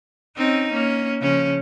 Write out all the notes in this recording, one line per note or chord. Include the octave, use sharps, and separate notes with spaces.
C4 C#4 D#4
A#3 C#4
C#3 F3 C#4